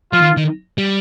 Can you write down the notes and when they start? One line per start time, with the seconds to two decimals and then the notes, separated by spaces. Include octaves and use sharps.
0.13 F3 F4
0.22 D#3
0.37 D#3
0.78 G3